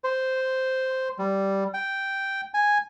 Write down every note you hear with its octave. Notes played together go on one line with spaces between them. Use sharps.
C5
G3
G5
G#5